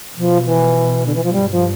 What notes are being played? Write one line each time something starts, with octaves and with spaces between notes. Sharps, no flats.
B2 F3
E3
D3
E3
F3
G2 G3
F3